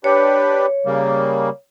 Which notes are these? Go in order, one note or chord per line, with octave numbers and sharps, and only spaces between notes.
D4 G4 B4 C#5
C#3 G3 A#3